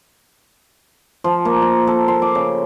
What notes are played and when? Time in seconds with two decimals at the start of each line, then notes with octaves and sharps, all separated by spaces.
1.24 F3
1.45 A#3
1.62 A#5
1.87 A4
2.08 C6
2.22 D6
2.35 C#3